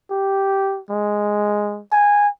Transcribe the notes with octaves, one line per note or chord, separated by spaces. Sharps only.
G4
G#3
G#5